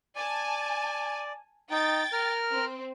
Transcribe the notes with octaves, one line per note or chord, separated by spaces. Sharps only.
D5 G#5 A5
D#4 G5 A6
A#4 F6
C4